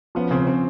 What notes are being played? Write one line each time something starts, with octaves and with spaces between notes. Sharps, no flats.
F3 B3 C#4
C#3 C4
C#3 C4